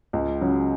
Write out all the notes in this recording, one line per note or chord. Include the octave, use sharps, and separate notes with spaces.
C#2
C#3 F#3